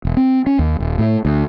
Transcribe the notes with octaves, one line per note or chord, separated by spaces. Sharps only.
E1
C4
C#4
D#2
D#1
A2
D2